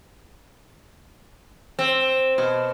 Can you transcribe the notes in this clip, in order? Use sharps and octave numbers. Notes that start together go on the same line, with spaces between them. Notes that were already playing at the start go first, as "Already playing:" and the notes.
C4
B2